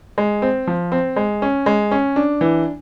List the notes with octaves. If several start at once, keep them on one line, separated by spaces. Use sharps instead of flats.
G#3
C4
F3
C4
G#3
C#4
G#3
C#4
D4
E3